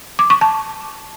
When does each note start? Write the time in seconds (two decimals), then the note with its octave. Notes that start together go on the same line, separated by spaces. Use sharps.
0.19 D6
0.30 C#6
0.41 A5